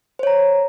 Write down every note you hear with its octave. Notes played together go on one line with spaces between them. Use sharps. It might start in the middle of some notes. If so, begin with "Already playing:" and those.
C5 C#5 A#5